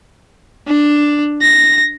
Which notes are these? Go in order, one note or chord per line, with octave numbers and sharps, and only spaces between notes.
D4
A#6